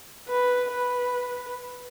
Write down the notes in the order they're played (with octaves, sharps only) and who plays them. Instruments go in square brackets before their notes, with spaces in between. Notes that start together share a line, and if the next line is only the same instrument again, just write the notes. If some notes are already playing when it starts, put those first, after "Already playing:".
[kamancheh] B4
B4